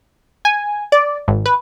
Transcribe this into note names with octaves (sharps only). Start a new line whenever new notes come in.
G#5
D5
G#1
B4